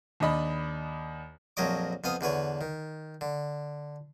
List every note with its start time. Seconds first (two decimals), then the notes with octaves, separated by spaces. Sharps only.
0.20 D#2 D4 D#5 B5
1.57 A#1 F2 F#3 C#5 D#5 D6
2.04 F2 B3 F5 D#6
2.21 E2 D3 B4 C#5
2.61 D#3
3.21 D3